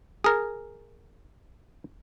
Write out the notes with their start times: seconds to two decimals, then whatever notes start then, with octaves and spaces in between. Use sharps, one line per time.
0.24 G#4 A#4